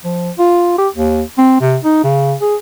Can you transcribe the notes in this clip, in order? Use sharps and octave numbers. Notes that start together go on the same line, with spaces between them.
F3
F4
G4
D#2
C4
C3
D#4
C#3
G#4